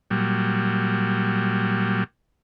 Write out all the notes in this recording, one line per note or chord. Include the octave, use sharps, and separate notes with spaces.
A#2 F#3 G3